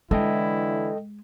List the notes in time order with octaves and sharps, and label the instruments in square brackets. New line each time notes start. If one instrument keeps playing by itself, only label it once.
[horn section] D3 E3 E4 [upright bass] G#3 [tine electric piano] A4 D#5 G5